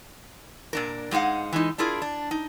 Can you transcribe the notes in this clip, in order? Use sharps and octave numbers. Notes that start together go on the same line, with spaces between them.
A#2 D4 A#4
G#2 G#3 D#4 F5 F#5
E3 G#3 D#4
D4 E4 F4 G#4 A#4
D4
D#4